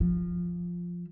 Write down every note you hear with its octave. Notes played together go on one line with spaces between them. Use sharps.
F3